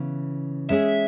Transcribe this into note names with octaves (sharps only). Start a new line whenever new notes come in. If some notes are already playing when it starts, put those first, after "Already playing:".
Already playing: C#3 E3 B3
G#3 C#4 G#4 E5